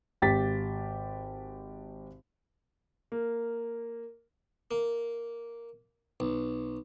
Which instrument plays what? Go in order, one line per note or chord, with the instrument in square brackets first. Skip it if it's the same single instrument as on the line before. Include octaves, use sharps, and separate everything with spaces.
[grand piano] G#1 G4 A6 B6
A#3
[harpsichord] A#3
B1